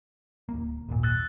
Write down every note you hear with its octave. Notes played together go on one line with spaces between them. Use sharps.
D1 A#3
G#1 D#2 A#2
E6 F#6 A6